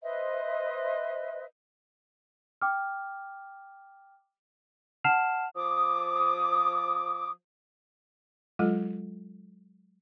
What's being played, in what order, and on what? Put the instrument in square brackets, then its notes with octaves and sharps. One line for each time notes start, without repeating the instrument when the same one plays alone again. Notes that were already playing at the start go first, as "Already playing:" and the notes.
[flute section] B4 C5 D#5 E5
[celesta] G5 D6 F6
F#5 A5 F6 C7 E7 F7
[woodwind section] F3 D6 D#6
[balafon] F#3 G#3 F4 A4 D#5